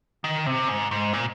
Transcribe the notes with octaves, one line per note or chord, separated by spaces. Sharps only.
D#3
C3
G#2
G#2
A#2